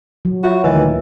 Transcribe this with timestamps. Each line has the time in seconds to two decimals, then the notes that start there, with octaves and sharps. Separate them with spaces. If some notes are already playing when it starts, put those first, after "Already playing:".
0.25 F#3
0.43 F4 F#4 C#5 E5
0.64 D2 A#2 D#3 E3 B4 D#5